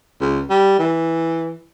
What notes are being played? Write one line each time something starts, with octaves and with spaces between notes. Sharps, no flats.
C#2
G3
E3